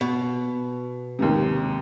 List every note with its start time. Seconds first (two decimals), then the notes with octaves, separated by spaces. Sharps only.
0.01 B2
1.19 D#2 G#2 C3